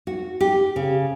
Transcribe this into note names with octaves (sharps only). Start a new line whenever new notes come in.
F#4
G4
C#3